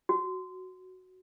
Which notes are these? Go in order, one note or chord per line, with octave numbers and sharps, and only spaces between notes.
F#4